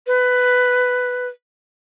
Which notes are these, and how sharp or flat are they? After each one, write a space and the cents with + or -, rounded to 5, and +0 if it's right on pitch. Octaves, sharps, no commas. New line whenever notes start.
B4 +10